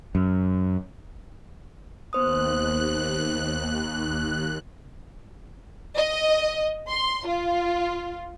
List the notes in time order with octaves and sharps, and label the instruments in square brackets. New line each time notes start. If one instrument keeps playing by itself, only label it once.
[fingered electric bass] F#2
[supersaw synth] D#2 F#6 [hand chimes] B3 C5 D#6
[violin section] D#5
C6
F4